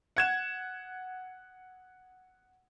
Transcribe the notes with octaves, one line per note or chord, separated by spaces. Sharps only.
F#5 G#6 E7